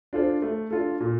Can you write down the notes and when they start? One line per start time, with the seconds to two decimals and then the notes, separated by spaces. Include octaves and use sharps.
0.13 D4 F4 A4 C5
0.42 A3
0.71 D4 F4 A4
1.00 A#2